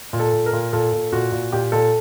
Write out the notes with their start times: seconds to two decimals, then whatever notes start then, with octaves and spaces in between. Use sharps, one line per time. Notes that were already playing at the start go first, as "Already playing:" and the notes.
0.13 A#2
0.20 A4
0.33 A#2
0.46 A#4
0.53 A#2
0.73 A#2 A4
0.92 A#2
1.13 A#2 F#4
1.32 A#2
1.52 A#2 G4
1.72 A#2 A4